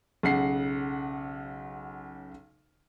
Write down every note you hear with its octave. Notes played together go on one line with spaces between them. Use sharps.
B1 C#3 F#5 C7